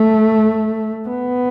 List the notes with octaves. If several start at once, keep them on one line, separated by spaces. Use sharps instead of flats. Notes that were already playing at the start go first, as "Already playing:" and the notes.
Already playing: A3
B3